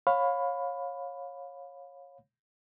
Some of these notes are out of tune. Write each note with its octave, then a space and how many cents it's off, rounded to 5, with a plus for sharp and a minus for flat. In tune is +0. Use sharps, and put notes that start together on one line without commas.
C#5 -15 F5 +25 B5 +10